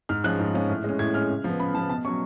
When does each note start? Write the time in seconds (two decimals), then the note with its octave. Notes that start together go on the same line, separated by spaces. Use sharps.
0.09 G#2 F6
0.24 F3 G#3 C#4 F#6
0.39 G#2
0.54 F3 G#3 C#4
0.69 A2
0.84 G#3 C#4
0.99 A2 G#6
1.14 G#3 C#4 F6
1.29 C#3
1.44 F3 B3
1.59 C#3 B5
1.74 F3 A5
1.78 B3
1.89 B2 A5
2.05 F#3 C#4 C#6